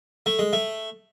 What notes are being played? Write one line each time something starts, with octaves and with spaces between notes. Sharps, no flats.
A3
G#3
A3